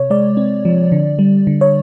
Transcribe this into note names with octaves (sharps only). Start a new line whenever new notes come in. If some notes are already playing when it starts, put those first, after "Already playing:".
Already playing: C3 C#5
G#3 D5
C4
F3
D3
G3
D3
C#5